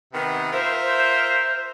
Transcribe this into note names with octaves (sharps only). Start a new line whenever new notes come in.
C3 D#3 B3
F4 A#4 C5 E5
C5